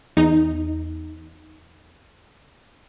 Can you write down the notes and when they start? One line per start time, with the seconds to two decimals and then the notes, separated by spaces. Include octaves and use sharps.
0.17 E2 D#4